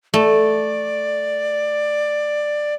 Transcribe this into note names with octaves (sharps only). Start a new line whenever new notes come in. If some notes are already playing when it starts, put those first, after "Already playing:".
A3 D5